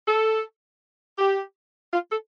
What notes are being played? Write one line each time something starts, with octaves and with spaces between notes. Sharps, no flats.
A4
G4
F4
A4